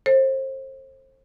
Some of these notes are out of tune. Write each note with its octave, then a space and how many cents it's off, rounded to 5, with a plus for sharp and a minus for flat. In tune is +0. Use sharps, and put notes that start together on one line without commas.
A4 +15 C5 +30